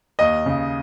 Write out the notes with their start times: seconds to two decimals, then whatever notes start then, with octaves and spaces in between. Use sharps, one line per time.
0.19 D#2 D#5
0.46 C#3